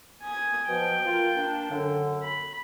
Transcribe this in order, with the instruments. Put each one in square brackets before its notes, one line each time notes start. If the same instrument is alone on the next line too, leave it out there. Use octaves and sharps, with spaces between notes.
[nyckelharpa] G#5 D#6
[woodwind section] B2 F3 [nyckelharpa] G5
[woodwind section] A#3 F4
A#3 D4
F#2 D3
[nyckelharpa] B5